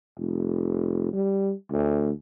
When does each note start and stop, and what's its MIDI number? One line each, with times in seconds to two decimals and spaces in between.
0.18 1.12 29
1.13 1.53 55
1.71 2.11 38